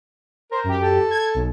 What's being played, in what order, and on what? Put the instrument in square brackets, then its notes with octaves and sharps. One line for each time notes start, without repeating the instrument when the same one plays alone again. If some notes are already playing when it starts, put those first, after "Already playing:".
[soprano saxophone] A#4 [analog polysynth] C5
[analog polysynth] F#2 G4
[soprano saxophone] A4
[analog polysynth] G#6
B1